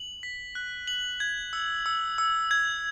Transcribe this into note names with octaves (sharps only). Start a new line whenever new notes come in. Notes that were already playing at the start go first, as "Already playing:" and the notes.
Already playing: F#7
B6
F#6
F#7
G#6
E6
E6
E6
G#6